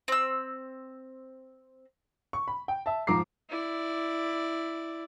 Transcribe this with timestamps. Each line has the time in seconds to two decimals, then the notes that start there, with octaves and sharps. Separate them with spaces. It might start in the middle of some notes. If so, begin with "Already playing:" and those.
0.08 C4 E6
2.33 C#6
2.48 B5
2.68 G5
2.86 E5 A5
3.07 G#2 F3 A#5 D6 C7
3.49 E4 D5